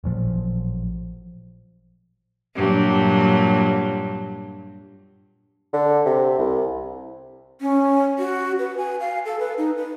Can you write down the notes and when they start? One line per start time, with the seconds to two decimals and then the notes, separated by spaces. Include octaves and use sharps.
0.04 A1 A#2 F3 F#3
2.55 G2 A#2 F#3
5.73 D3
6.06 C3
6.38 C2
7.61 C#4
8.19 F#4
8.59 B4
8.78 G#5
9.00 F5
9.26 A4
9.40 B4
9.58 D#4
9.77 B4